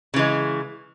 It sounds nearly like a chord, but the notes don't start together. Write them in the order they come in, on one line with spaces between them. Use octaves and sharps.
C#3 E3 G#3